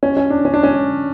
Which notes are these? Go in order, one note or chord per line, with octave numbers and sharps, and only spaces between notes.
C#4
C#4
D4
C#4
D4
C#4